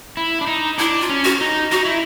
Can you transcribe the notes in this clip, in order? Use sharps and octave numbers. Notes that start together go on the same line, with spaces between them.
E4
D4
D#4
D4 E4
F4
C#4
F#4
D#4
D#4 F#4
E4